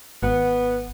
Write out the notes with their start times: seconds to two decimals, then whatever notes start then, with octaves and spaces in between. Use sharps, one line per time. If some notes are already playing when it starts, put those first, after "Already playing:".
0.23 G#1 B3